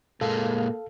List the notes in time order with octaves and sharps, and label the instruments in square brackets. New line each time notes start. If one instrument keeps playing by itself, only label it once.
[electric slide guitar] A#2 G#3 [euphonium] A#3 [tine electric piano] A4 F5